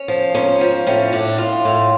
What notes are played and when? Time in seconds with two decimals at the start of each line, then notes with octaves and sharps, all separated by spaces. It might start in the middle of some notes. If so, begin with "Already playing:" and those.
Already playing: C#4
0.08 F3
0.35 G#2 C#4
0.61 F3
0.87 A2 C#4
1.13 A2 D4
1.38 A2 F4
1.65 A2